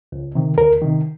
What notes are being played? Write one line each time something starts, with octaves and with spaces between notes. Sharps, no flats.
C#2
C3 D#3
D2 A#4
C3 D#3